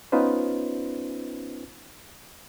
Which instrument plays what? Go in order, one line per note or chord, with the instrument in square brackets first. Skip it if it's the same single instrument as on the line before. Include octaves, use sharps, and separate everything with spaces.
[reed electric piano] B3 C#4 D#4 F4 B4 C5